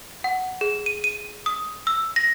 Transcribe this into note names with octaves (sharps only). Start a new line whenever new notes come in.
F#5
G#4
D#7
D#7
D#6
E6
A#6